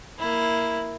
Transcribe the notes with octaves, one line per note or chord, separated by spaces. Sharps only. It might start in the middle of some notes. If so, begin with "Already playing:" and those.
A#3 E4